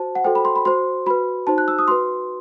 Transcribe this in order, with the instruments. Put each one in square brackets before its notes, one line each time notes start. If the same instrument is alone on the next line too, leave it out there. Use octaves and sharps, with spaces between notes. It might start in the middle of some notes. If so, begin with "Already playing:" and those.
Already playing: [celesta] F#4 C5 A5
F#5
F#4 A4 C5 G5
B5
C6
B5
F#4 C5 C6
F#4 B4 B5
D#4 F#4 C5 A5
F#6
E6
D#6
F#4 B4 C6